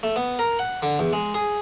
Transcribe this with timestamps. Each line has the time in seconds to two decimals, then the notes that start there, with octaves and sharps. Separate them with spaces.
0.03 A3
0.16 B3
0.39 A#4
0.59 F#5
0.82 D3
0.99 E2
1.13 G#3
1.34 G#4